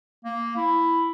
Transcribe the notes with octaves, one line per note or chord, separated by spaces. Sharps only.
A#3
E4